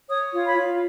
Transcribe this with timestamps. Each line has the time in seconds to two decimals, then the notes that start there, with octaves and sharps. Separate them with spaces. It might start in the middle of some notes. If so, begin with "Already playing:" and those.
0.09 C#5 D#6
0.33 F4
0.45 B5
0.58 F4